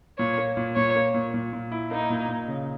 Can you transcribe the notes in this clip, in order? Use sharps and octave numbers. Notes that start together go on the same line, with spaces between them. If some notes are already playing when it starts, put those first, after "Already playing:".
A#2 C#5
A#3
A#2
A#2 C#5
A#3
A#2
A#2
A#2
E4
A#3 D#4
A#2
A#2
C#3